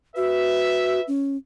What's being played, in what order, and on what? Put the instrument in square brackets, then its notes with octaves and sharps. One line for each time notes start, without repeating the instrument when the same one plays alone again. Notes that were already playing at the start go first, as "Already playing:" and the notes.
[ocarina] F#4 [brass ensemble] B4 E5
[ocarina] C#4